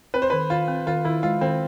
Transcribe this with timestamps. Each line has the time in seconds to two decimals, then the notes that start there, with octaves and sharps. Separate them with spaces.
0.14 C4 B4
0.22 C5
0.30 D#3 B4
0.50 D#3 F4
0.68 C4
0.87 D#3 F4
1.04 D#3 E4
1.23 G#3 F4
1.41 D#3 C4